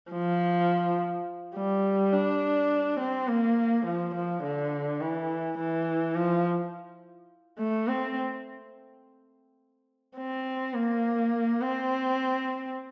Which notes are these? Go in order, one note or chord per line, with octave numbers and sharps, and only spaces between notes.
F3
G3
D4
C4
A#3
F3
F3
D3
E3
E3
F3
A3
C4
C4
A#3
C4